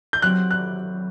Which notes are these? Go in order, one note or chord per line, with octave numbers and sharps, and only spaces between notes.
G6
F#3 C4 G4 F#6
F#6